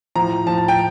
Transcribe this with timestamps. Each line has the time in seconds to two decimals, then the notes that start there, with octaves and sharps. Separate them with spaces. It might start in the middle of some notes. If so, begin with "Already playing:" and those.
0.16 A2 F3 A#5
0.47 F3 A5
0.50 A2
0.58 A5
0.68 G5